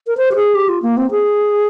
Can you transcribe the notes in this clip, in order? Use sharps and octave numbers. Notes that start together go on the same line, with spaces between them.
A#4
C5
G4
G#4
G4
F4
A#3
C4
G#4